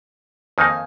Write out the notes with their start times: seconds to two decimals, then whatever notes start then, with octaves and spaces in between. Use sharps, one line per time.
0.58 F2 D#3 A#3 D#4 G#5
0.69 F5